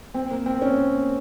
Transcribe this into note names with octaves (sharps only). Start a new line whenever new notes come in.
C4
A#3
C4
C#4
A#3